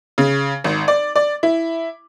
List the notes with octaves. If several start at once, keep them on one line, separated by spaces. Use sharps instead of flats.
C#3
G#1
D5
D5
E4